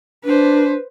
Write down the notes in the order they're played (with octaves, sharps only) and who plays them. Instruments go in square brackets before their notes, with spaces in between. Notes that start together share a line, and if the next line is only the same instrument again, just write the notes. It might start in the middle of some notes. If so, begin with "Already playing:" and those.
[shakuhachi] D4 [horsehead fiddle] B4 C5